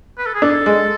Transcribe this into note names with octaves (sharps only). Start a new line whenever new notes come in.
B4
A4
G#4
D4 A4
G#3